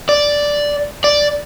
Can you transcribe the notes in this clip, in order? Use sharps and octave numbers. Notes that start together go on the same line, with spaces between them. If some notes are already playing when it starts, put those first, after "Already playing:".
D5
D5